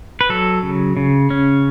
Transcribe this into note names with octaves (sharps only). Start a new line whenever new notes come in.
B4
F#3 A4
C#3
C#3
C#4